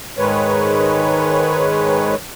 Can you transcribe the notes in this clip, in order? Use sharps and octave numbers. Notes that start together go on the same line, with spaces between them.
G#2 D#3 G#3 B4 C#5